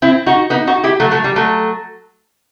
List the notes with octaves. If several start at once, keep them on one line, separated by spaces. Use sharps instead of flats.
C4 E4
D#4 F#4
B3 D#4
D#4 F#4
E4 G4
F#3 A3
F#3 A3
G3
F#3 A3